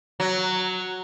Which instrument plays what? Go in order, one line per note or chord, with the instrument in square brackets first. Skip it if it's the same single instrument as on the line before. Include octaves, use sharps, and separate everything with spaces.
[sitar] F#3